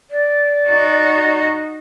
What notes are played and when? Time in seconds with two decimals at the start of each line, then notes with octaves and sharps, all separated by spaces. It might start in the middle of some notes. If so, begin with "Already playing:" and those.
0.10 D5
0.69 D#4 F#4